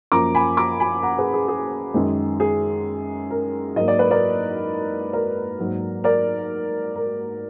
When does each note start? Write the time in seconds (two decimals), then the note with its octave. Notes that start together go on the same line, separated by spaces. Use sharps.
0.12 F#2 F3 A#3 A#5 D6
0.35 G#5 B5
0.57 A#5 D6
0.80 G#5 B5
1.03 F#5 A#5
1.18 G#4 B4
1.33 G#4
1.48 G#4
1.94 F#2 D#3 G#3
2.40 G#4
3.30 A#4
3.76 G#2 F#3 A#3 D#5
3.88 D5
3.99 B4
4.11 A#4 D5
5.13 A#4 D5
5.59 G#2 F#3 A#3
6.04 A#4 D5
6.96 A#4